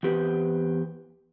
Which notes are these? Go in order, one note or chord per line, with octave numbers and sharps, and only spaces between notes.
E2 C4 G4 B4 C5 D#5